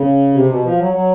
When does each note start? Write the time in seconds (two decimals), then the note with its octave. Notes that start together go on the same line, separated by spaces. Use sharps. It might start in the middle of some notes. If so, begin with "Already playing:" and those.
Already playing: C#3
0.34 C3
0.49 B2
0.64 F3
0.79 F#3
0.93 F#3